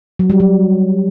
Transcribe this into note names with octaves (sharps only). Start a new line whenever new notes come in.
F#3
G3
F#3